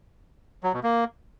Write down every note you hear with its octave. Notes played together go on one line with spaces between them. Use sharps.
F#3
B2
A#3